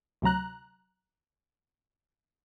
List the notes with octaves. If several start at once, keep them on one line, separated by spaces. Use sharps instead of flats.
D2 C3 F#3 A#5 F#6